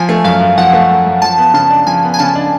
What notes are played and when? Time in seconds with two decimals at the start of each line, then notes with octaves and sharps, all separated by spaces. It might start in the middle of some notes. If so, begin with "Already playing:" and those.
Already playing: F3 G#5
0.09 A3
0.24 F#2 F5
0.41 F#2
0.57 F3 F#5
0.73 A3
0.89 F#2
1.06 F#2
1.22 F3 A5
1.38 B3
1.54 C#3 A5
1.70 D4
1.87 F3 G#5
2.04 B3
2.14 G#5
2.19 C#3 A5
2.35 D4